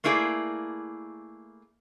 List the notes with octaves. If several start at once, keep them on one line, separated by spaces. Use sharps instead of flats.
A3 A#3 E4 G#4 B4 D5